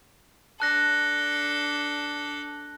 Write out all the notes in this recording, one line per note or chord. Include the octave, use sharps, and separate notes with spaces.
D4 A4 A5 F#6 A#6